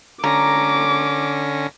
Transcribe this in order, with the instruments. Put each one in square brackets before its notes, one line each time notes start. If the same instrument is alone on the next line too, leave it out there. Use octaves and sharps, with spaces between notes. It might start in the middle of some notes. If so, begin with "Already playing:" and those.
[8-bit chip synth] D3 C#4 A#6 [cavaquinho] A#5 [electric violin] D6